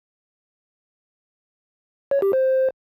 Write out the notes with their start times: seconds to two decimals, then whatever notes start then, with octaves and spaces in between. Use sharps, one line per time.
2.11 C#5
2.22 G4
2.33 C5